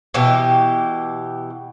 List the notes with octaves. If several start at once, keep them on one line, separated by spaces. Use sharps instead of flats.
B2 E3 G4